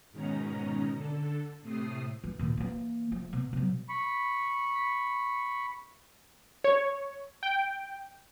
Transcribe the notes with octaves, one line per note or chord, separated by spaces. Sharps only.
G#2 B2 D#3 C#4 A#5
D3 A4
A2 C3 A3 D#6 C7
E3
D#2 A#2
E3 A#3
F3 A3
B2
B2 F#3
B5 C#6
C#5
G5